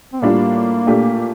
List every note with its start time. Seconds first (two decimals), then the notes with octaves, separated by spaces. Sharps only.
0.13 C4
0.21 A2 G3 A#3 D4 F4
0.87 A#2 A3 D4 G4